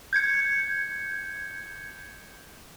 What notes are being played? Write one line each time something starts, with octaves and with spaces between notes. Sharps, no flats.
G6 G#6 C#7